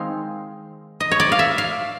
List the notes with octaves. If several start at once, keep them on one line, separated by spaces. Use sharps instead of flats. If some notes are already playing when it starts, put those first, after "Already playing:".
Already playing: D#3 G#3 C4 D#4 F5
D#5
C#5
D5
F5
E5
F5